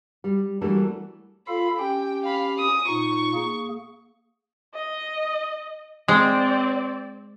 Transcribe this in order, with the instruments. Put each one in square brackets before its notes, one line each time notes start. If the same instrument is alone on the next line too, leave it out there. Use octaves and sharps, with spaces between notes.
[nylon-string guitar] G3
E3 F#3 G3 A3 A#3 D4
[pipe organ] F4 A4 F5 [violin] B5
[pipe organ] C#4 G4 [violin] G5
[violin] F5 B5
D#6
[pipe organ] A#2 D#4 [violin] C#6
[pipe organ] A#3 G#4
[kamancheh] D#5
[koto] G#3 [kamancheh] C4 D5